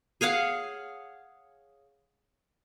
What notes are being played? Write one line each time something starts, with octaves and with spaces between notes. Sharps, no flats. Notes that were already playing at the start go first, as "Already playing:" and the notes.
G#4 C#5 F5 F#5